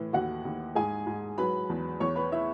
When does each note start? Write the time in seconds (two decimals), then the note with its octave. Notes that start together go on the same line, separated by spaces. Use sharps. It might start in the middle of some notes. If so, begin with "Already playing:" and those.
Already playing: A2 E3
0.13 D#2 F#4 F#5
0.45 D#2
0.75 G#2 G#4 G#5
1.07 G#2
1.38 F#3 B4 B5
1.70 E2
2.00 E2 C#5 C#6
2.16 B4 B5
2.32 E4 E5